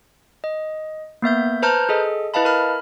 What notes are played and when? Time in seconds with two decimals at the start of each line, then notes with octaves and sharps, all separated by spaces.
0.44 D#5
1.22 A#3 B3 E5 G6
1.62 B4 C5 A5 A#5 F6 G6
1.89 G#4 A4 D#5
2.34 E4 B4 D#5 F5 A5 B5
2.45 A#4 B5 F6